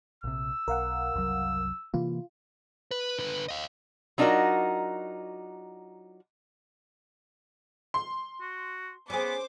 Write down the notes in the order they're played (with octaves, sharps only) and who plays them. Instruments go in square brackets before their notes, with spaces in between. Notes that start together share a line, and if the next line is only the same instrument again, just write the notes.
[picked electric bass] A#1 C3 [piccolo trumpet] E6
[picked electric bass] B1 [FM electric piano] A#4 F5 F#5
[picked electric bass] F#1 C2 F#3
[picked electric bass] C3 E3 A#3 [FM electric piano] F4
[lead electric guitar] B4
D3 B4
D#5 F5
[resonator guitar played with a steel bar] F#3 D4 D#4 F4 F#4 A#4
[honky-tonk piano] C6
[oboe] F#4
[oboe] B3 [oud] C#4 G#4 [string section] C5 D6